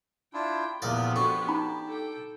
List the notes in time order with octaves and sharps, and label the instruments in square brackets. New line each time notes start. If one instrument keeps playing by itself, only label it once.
[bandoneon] D4 E4 F4 [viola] G5
[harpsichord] E2 A#2 D5 [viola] F3 B3 [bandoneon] G4
[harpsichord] D4 [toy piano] F#4 A4 C#6
[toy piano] D#4 A#5 B5
[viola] A4 G5